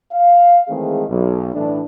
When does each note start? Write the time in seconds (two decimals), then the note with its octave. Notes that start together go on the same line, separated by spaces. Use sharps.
0.12 F5
0.69 D#3 E3 G#3 A3 C4 G#4
1.09 B1
1.54 A2 E3 A3 D4